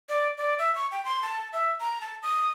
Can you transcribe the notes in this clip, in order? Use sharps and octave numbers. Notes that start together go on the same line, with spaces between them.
D5
D5
E5
C#6
G5
C6
A5
E5
A#5
A5
D#6